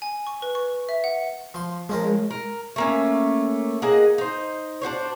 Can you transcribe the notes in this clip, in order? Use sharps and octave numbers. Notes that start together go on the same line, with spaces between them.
G#5
C#6
B4
C#6
E5
F#5
F3 C6
F3 G#3 C#4 A#4
A#4
A3 A#3 C#4
A#3 G#4 D#5 F#5
D#4 C5
D4 F#4 C5 C#5